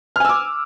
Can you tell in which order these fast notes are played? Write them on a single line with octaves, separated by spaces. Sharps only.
F6 G#5 E6 D6